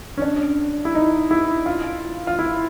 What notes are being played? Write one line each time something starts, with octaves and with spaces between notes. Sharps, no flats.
C#4
D4
E4
D#4
E4
F4
F4
E4